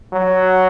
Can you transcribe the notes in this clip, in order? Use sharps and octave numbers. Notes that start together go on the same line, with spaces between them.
F#3